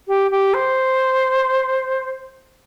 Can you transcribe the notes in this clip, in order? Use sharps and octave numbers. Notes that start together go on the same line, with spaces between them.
G4
G4
C5